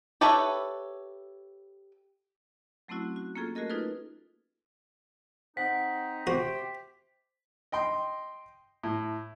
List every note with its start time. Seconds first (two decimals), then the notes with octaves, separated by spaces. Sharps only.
0.21 G4 A4 B4 C#5 E5
2.88 F#3 A3 C4 C#4 E4 F#4
3.16 F#4
3.35 A#3 C#4 F4 G#4 A4
3.55 A3 F#4 G#4 A#4 D#5
3.70 D#4 F4 G#4 A4 B4
5.57 C4 D#4 F#5 B6
6.27 C3 F#4 G4 C5 G5
7.72 D#5 G5 C6
8.83 A2